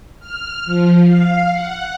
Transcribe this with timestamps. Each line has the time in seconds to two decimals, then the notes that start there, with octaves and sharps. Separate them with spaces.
0.20 F6
0.65 F3
1.06 F5
1.50 F#5